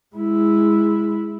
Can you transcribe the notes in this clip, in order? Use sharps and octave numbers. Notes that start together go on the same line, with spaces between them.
G#3 E4